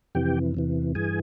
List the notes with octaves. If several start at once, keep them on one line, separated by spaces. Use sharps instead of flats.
F2 C3 E3 G4 G5
E2 C3 E3
G2 E3 G#4 G#5